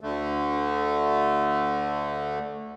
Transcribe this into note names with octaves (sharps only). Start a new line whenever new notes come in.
D2 D3 A3